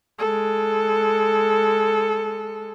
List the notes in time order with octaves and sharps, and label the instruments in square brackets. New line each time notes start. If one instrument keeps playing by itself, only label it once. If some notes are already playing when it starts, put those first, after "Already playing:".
[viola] G#3 A4